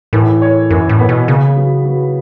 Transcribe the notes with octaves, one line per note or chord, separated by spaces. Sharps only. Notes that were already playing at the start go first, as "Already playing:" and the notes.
A2 E3
C#5
F#2 E3
A2
B3
B2
C#3 B3
F#3
F#3